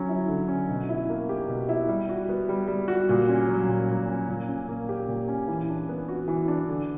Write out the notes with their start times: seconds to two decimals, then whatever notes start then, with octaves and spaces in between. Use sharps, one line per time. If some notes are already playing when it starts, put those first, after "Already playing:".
Already playing: D3 F#3 C#4
0.09 E4
0.28 D3
0.48 C#4
0.69 B2
0.89 E4
1.09 A#3
1.29 G4
1.48 B2
1.69 E4
1.88 G3
2.09 F#4
2.29 B3
2.49 G3
2.68 G3
2.88 F#4
3.09 A#2
3.29 C#4
3.49 F#3
3.68 A#2
3.89 A#2
4.08 C#4
4.28 A#2
4.48 C#4
4.68 A#3
4.89 G4
5.08 A#2
5.28 C#4
5.48 E3
5.69 D4
5.89 B3
6.08 F#4
6.28 E3
6.48 D4
6.68 D3